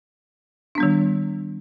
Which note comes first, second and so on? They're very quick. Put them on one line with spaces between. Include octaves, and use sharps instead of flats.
D4 B3 G3 D#3